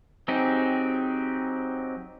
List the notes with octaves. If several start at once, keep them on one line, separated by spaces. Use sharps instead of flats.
F#3 C4 D#4 G4 G#4